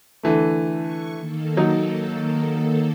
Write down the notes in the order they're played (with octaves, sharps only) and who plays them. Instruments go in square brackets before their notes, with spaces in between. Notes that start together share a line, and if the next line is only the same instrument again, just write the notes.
[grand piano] D3 E3 A3
[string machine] C#6
D#3 A#3 A4
[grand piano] F#3 D#4